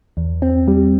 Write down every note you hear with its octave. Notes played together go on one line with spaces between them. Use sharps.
E2
C4
G3